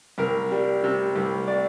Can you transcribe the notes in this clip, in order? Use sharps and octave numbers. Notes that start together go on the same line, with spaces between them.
C2 A#4
G3
C3
C2
D5